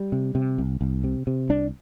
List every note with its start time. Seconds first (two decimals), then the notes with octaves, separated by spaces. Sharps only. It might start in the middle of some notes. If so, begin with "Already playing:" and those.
Already playing: G3
0.12 C3
0.35 C3
0.58 C2
0.81 C2
1.04 C3
1.27 C3
1.49 C2 D4